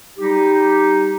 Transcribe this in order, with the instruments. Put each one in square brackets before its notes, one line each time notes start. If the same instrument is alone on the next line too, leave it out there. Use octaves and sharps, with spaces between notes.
[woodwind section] G3 D#4 G4